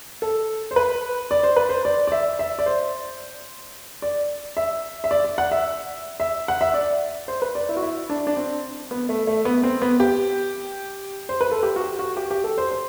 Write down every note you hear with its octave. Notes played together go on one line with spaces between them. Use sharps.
A4
C5
B4
D5
C5
B4
C5
D5
D5
E5
E5
D5
C5
D5
E5
E5
D5
D5
F#5
E5
E5
F#5
E5
D5
C5
B4
D5
E4
F#4
E4
D4
D4
C4
B3
A3
A3
B3
C4
B3
G4
C5
B4
A4
G4
F#4
G4
F#4
G4
G4
A4
C5
C5